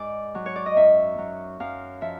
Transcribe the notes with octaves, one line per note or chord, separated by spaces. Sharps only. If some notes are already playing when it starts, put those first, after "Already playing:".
Already playing: G#2 D5
F#3
C#5
D5
D#5
F#2 E5
F#3
F#2 F5
F3 E5